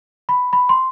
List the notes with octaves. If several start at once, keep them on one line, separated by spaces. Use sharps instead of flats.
B5
B5
C6